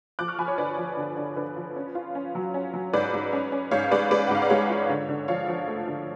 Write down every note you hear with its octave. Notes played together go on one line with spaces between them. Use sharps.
F3 D6 F#6
C#6 F6
F3 G#5 B5
C#5
D3 B4 D5
F3
D3
D3
D3 B4
F3
C#4
F4
C#4
F#3
C#4
F#3
G#2 B4 D5
G#2
C#4
C#4
G#2 C#5 F5
G#3 B4 D5
G#3 B4 D5
F#5
G#2 F5
D5
G#3 C#5
F4
D3
D3
F3 C#5 F5
F3
A3
D3